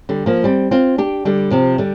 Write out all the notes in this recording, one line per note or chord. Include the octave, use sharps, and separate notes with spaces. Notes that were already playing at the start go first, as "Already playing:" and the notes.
D3 G3
F3 A#3
G3 C4
C4 F4
D4 G4
D3 G3
C3 F3
D3 G3